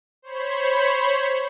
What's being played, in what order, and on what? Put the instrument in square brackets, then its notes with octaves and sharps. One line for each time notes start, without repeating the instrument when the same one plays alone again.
[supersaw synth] C5 C#5 B5